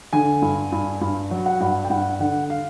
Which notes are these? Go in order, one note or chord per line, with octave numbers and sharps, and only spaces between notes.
D3 G#5
G2
G2
G2
F#3
F#5
G2 F#5
G5
G2 F#5
D3 F#5
F5